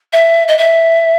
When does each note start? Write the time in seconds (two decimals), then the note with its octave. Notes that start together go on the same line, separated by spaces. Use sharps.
0.12 E5
0.48 D#5
0.57 E5